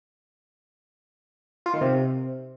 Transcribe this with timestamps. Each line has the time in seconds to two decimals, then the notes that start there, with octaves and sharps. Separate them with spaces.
1.66 F4
1.74 D#3
1.81 C3